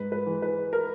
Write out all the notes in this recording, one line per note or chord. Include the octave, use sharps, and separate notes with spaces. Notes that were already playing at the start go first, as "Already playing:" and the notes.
Already playing: G#2 B4
B4
E3 G#3
B4
A#4